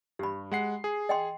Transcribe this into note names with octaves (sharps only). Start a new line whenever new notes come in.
G2 G4 B5
G#3 F#5 C7
G#4
D#5 G5 C6